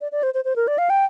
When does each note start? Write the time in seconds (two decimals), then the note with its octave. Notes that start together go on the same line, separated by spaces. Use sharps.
0.01 D5
0.12 D5
0.23 C5
0.34 C5
0.45 C5
0.56 A#4
0.68 D5
0.78 F5
0.90 G5